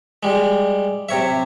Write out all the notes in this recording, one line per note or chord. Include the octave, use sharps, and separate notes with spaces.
G3 G#3
C3 C#5 E5